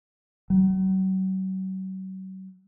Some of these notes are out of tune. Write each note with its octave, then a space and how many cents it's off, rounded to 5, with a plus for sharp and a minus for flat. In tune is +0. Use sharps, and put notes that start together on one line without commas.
F#3 +40